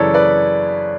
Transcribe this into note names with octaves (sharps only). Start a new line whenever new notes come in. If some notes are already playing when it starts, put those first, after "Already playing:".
Already playing: F#2 C#3 E3 A4 B4 C#5 D5
B4 D5